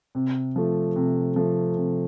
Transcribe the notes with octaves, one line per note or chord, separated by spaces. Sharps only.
C3
F3 A3
C3
F3 A3
C3